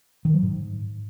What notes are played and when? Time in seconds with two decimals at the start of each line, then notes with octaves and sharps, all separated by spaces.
0.25 D#3
0.34 F#3
0.43 G#2